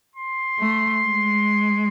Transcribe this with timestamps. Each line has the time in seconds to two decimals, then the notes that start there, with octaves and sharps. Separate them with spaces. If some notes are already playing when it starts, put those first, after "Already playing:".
0.15 C6
0.59 A3
1.03 G#3